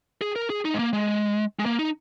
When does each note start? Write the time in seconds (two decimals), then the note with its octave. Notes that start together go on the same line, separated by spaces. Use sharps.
0.21 G#4
0.36 A#4
0.50 G#4
0.65 D#4
0.74 G#3
0.79 A#3
0.93 G#3
1.59 G#3
1.66 A#3
1.79 D#4